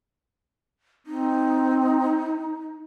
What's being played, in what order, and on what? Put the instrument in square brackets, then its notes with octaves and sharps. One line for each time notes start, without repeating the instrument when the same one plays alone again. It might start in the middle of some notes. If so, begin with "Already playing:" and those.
[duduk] C4 [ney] D#4